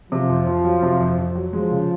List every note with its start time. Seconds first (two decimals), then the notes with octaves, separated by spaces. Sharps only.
0.11 C3 F3
0.29 F2
0.46 F2
0.64 F#3
0.82 C3
1.00 F2
1.18 F2
1.35 F#3
1.53 F3 G#3
1.71 C#3